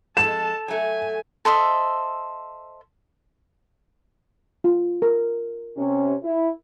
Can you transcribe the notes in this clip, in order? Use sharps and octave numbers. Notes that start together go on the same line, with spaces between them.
F2 G#3 A4 A5 E7
F#3 A3 G#5
A4 C5 D#5 E5
F4
A#4
C3 C#4
E4